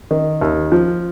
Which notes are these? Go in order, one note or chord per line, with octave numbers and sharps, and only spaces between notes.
D#3
D#2
F3